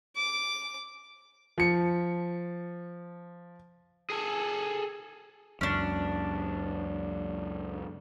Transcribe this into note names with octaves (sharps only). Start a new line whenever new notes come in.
D6
F3 C#7
G#4 A4
C#2 F#2 C#4 D4